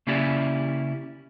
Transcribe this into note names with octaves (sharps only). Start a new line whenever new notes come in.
C#3 A#3 C#4 E4 G4 D5